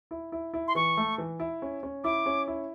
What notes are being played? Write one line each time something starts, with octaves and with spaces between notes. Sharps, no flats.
E4
E4
E4
C6
E3 C#6
A3
E3
E4
C#4
C#4
E4 D6
C#4
E4